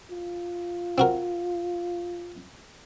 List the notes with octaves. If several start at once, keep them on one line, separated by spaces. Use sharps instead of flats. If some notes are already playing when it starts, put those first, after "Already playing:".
F4
C4 F#4 A#4